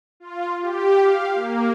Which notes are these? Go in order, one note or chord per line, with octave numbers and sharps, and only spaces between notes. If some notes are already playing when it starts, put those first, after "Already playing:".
F4
G4
F5
A#3